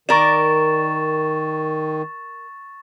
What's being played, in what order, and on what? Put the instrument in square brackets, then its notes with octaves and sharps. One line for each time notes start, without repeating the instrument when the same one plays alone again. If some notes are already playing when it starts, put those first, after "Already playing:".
[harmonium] D#3 [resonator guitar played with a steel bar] A#4 D5 [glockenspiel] C#6 A6 E7